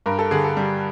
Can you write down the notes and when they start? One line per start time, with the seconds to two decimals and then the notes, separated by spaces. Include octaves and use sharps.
0.06 G2 A#4
0.19 A4
0.31 D3 G#4
0.44 A4
0.57 G3